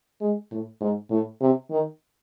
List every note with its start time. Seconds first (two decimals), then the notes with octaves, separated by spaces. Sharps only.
0.21 G#3
0.51 A2
0.81 G#2
1.11 A2
1.41 C3
1.70 D#3